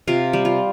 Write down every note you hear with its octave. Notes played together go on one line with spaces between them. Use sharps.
C3 F4
G3
F4